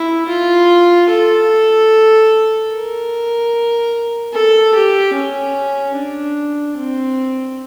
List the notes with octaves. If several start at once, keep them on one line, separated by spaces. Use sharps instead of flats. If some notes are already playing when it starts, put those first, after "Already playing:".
Already playing: E4
F4
A4
A#4
A4
G4
C#4
D4
C4